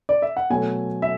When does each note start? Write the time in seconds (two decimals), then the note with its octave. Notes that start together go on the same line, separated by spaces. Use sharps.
0.09 D5
0.22 E5
0.37 F#5
0.50 B2 F#3 A3 G#5
1.02 E5